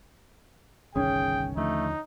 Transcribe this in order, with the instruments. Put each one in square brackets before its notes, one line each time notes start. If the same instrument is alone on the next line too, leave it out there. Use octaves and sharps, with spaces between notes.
[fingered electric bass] G1 C2 D#3 [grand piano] C#4 [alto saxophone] G#4 [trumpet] G5
[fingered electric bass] D#2 D3 F3 [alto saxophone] A3 [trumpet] D#4